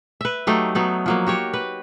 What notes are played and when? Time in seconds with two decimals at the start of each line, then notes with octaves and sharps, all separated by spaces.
0.21 B4 E5
0.47 F#3 A3 D#4 G4
0.75 F#3 B3 D#4
1.06 F3 F#3 A#3
1.27 F#4 G4 C#5
1.53 B4